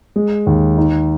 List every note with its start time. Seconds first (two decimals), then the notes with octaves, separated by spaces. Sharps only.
0.16 G#3
0.47 D#2
0.77 D#4